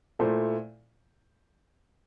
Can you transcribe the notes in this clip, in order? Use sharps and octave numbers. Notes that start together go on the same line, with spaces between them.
A#2 A3 E4 A4 C5